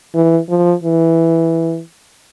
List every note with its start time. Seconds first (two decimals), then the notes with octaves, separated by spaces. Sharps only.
0.15 E3
0.49 F3
0.84 E3